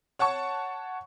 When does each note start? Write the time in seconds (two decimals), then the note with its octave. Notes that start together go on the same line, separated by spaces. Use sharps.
0.19 C#5 F#5 A5 C#6